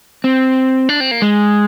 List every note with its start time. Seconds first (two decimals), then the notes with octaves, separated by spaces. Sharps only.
0.24 C4
0.89 D4
1.00 C4
1.11 A#3
1.22 G#3